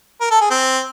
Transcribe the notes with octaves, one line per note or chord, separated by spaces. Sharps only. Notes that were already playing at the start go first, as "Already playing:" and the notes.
A#4
A4
G#4
C4